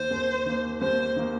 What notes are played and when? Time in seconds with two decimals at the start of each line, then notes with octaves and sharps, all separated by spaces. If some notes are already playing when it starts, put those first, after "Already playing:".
Already playing: D#2 D#3 A#3 C5
0.11 D#2
0.46 D#3 A#3
0.81 D#2 C5
1.16 D#3 A#3